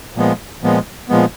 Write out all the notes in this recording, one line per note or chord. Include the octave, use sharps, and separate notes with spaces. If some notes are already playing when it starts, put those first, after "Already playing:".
A#2 F3 G#3 B3
A#2 F3 G#3 B3
A#2 F3 G#3 B3